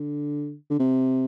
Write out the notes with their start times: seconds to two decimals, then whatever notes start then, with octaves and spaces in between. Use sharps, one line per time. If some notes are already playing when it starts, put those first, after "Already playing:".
Already playing: D3
0.70 D3
0.79 C3